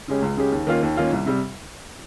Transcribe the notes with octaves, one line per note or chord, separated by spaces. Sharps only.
C#3 G#3 C#4 G4
C#2
C#3 G#3 C#4 G4
D#2
D#3 A#3 C#4 F4
D#2
D#3 A#3 C#4 F4
C2
C3 G3